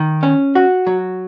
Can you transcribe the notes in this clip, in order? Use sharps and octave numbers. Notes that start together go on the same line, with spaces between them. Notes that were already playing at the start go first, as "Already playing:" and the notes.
Already playing: D#3
C#4
F#4
F#3